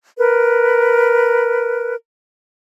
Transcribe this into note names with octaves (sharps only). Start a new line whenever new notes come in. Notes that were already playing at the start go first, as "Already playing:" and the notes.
A#4 B4